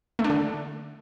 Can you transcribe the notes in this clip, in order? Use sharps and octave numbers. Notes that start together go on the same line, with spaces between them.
A3
D4
D3